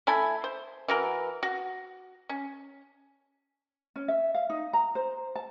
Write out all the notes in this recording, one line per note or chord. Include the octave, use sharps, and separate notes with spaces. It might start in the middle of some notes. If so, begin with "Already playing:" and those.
A3 E4 G#5 B5
C5
E3 F#4 A#4
F#4
C#4
C#4
E5
F5
D#4
A#5
C5
A5